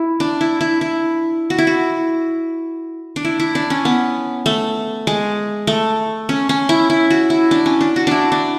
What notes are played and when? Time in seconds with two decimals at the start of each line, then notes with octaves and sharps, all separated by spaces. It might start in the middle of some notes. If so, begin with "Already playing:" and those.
Already playing: E4
0.20 D4
0.41 E4
0.61 E4
0.81 E4
1.50 F#4
1.58 E4
1.67 F#4
3.16 D4
3.25 E4
3.40 E4
3.55 D4
3.70 C#4
3.85 B3
4.46 A3
5.07 G#3
5.67 A3
6.29 C#4
6.49 C#4
6.69 E4
6.90 E4
7.10 F#4
7.30 E4
7.51 D4
7.66 C#4
7.81 D4
7.96 F#4
8.07 D4 E4
8.32 D4